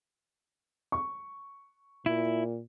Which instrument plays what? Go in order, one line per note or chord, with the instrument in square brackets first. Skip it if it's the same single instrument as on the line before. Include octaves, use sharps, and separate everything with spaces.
[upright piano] C#6
[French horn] A#2 [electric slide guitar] E4